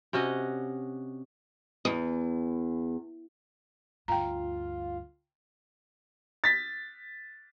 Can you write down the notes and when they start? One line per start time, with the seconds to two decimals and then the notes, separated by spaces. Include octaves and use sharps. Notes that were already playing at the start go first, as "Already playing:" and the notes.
0.13 C3 C#4 F#4 D#5
1.85 E2
4.08 D2 G2 F4 G5 A#5
6.44 A6 B6